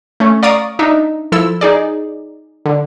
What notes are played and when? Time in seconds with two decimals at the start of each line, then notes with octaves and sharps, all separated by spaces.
0.20 A3 C#4
0.43 D5 F5 A#5 C#6 D#6 D7
0.79 D4 D#4 E5
1.32 F3 E4 A4 E6
1.61 D#4 G#4 D5
2.66 D3